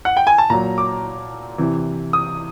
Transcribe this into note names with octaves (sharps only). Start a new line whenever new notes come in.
F#5
G5
G#5
A5
A#2 F#3 A#5
D6
C3 E3
D#6